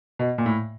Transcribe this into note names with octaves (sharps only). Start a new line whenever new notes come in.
B2
A#2
A2